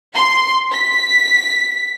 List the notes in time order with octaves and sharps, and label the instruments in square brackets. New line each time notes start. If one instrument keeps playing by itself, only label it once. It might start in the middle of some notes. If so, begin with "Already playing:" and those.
[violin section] C6
B6